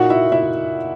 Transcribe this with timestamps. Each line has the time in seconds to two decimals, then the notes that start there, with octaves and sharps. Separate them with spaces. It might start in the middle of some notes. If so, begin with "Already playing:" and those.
Already playing: A#2 A#3 D#4 F#4 F#5
0.10 E4 E5
0.32 E4 E5